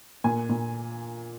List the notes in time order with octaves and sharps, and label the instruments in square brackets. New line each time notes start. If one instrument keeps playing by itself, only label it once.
[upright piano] A#2 G#5
A#2